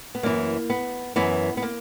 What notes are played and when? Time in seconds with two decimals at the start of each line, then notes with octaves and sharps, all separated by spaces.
0.15 B3
0.23 F#2 E3 A#3
0.70 B3
1.16 F#2 E3 B3
1.57 B3
1.62 A#3